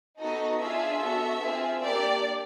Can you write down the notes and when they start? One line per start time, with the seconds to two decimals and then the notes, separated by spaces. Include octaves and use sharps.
0.19 B3 D#4 F#4 A4 D#5
0.60 D4 F4 G#4 E5
1.01 B3 D4 F#4 A4
1.41 C4 F4 G#4
1.82 A#3 D4 G4 D5